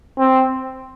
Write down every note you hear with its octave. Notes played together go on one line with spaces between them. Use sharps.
C4